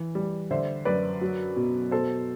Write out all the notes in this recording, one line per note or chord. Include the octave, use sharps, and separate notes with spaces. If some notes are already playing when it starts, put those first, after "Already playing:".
Already playing: E3
G3
D3 C5 E5
F#2 B4 D5
F#3
B2
B2 A4 C5